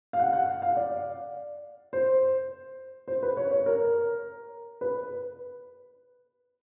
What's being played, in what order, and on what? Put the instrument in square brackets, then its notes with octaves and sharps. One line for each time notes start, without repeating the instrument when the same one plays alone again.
[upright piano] F5
F#5
F#5
F5
D5
C5
C5
B4
C#5
C#5
A#4
B4